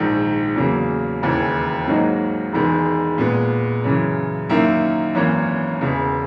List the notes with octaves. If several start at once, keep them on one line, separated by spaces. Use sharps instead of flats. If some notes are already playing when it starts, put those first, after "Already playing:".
Already playing: A#1 G#2 D#3
E2 C#3 F#3 A#3
E1 D#2 C#3 E3
G#2 F#3 A#3 D#4 F#4
E1 E2 D#3 G#3
A#2 G#3 B3
F#2 C#3 E3
F#2 D#3 A#3 E4
G#1 F#2 E3 A#3 C#4
E1 E2 C#3